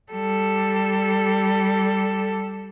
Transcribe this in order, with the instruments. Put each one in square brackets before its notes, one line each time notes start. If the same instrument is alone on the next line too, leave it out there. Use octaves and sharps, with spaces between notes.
[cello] G3 A4